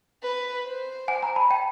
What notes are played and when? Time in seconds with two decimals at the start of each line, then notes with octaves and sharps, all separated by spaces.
0.23 B4
0.66 C5
1.08 F#5 G#5
1.23 G#5 A#5
1.36 A5 B5
1.50 G5 A5